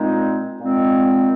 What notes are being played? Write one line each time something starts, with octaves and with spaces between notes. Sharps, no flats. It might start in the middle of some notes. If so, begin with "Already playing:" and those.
Already playing: A#2 G#3 C4 D#4
A#2 G#3 C4 D#4